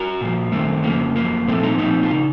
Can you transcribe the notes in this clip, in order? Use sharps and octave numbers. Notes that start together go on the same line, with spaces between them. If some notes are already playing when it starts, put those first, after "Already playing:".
Already playing: F#4 A#4
A#2 F3
F#2 D#3 A3 C4
F2 C#3 F3 A#3
F#2 F3 A#3
A#2 F3 A3 C4
C4 D#4
A#2 F3 C4 D#4
F4
C#3 D#4